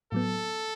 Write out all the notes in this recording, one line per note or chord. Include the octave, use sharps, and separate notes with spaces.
A2 F#3 B3 A4